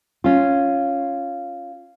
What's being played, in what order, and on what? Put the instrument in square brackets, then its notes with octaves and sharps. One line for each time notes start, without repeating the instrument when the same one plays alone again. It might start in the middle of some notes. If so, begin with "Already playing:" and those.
[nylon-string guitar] C#4 F4